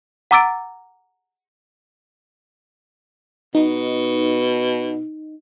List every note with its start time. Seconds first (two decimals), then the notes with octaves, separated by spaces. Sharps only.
0.31 F#5 A#5 D6 E6 A6 D7
3.55 B2 D#4